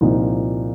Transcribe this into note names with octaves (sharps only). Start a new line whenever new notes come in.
C2 A#2 F3 C4 D#4